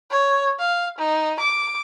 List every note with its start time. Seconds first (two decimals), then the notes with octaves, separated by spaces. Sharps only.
0.11 C#5
0.59 F5
0.98 D#4
1.39 D6